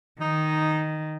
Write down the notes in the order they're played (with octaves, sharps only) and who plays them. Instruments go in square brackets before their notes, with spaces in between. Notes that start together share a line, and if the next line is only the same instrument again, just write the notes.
[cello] D#3 [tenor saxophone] D#4